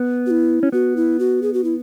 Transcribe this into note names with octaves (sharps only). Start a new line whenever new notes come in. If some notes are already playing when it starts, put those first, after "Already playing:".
Already playing: B3
F#4
E4
C#4
B3 F#4
E4
F#4
G#4
F#4
E4